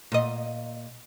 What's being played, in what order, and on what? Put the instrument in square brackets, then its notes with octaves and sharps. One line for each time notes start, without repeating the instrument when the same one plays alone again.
[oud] A#2 D#5